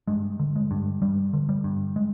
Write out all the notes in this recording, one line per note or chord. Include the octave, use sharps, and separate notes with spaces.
G2 G#3
D3
G#3
G2
G2 G3
D3
G3
G2
G#3